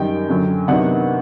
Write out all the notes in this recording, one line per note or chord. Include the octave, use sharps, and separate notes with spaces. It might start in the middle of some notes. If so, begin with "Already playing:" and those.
Already playing: F#2 D#3 G3 G5
F#2 D3 F#3
C3 D#3 F#3 B3 D4 F#5